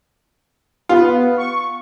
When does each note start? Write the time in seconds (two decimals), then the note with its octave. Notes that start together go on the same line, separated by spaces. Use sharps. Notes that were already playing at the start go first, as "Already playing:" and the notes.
0.89 B3 F4
1.37 C#6